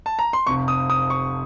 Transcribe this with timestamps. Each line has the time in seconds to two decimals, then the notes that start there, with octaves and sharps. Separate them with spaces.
0.06 A5
0.19 A#5
0.33 C6
0.47 F1 F2 C3 C#6
0.68 D#6
0.90 D#6
1.10 C#6